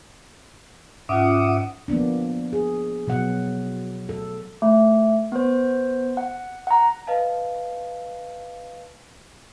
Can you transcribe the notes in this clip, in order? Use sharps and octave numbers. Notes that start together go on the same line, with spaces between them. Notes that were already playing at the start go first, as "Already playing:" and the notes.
G#2 C#4 F4 E5 F#5 D6 D#6
F3 A#3 B3 D4
G#4
B2 F#3 B3 F#5
A4
A3
B3 C5
F#5
F#5 A#5
B4 D#5 F5 A5